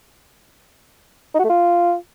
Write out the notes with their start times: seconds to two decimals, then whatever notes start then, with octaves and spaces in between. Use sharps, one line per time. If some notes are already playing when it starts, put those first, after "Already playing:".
1.34 D#4
1.39 F#4
1.44 A3
1.49 F4